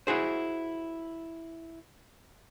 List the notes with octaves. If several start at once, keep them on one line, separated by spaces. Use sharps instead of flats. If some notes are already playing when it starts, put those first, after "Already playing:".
E4 F#4 G#4 C5